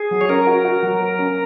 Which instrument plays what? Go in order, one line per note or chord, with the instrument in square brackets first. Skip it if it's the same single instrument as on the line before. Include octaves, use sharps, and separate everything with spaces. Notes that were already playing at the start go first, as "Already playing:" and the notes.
Already playing: [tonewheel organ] G#4
[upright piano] F#3
[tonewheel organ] C#5
[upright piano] C#4 [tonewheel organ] A#4
[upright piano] F#4
F#4
F#3
A#3
C#4